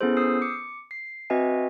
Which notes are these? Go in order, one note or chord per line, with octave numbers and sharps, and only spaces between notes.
B3 C#4 E4 G#4 A4 C5
D#6 E6 G6 C7
D6 C#7
C7
C4 F#4 B4 D#5 E5 G#5